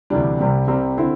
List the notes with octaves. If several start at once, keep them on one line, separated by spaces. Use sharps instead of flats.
D2 C3 E3 G3 D4
C2 C3 G3 C4
C2 C3 G3 C4
D3 C4 E4